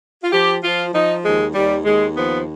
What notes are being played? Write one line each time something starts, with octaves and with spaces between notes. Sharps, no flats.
F4
F3 G4
F3 F4
F3 D#4
D#2 G#3
D#2 G3
D#2 G#3
F3 B3